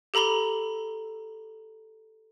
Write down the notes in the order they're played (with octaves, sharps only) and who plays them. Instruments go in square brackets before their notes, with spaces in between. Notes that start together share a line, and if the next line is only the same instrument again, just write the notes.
[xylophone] G4 A4 A#5 B5 G7